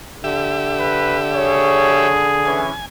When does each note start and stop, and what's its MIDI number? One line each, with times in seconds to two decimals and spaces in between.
0.24 2.67 50
0.24 2.08 67
0.24 2.08 76
0.80 1.19 71
1.34 2.80 68
1.34 2.11 73
2.45 2.72 52
2.45 2.72 61
2.45 2.86 80